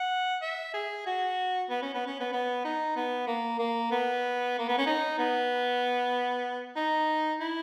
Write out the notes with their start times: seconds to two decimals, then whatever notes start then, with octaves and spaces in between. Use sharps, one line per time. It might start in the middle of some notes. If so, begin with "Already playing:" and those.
Already playing: F#5
0.42 E5
0.74 G#4
1.06 F#4
1.70 B3
1.82 C#4
1.94 B3
2.07 C#4
2.20 B3
2.33 B3
2.65 D#4
2.96 B3
3.27 A#3
3.59 A#3
3.92 B3
4.59 A#3
4.69 B3
4.78 C#4
4.86 D#4
5.18 B3
6.76 D#4
7.40 E4